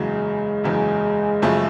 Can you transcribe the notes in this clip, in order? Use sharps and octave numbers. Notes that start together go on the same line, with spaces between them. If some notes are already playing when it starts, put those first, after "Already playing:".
Already playing: F#1 E2 C#3 F#3 G#3
F#1 E2 C#3 F#3
F#1 F#2 C#3 F3 A3